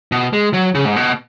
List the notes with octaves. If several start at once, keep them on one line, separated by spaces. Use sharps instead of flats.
B2
G#3
F#3
C#3
G#2
B2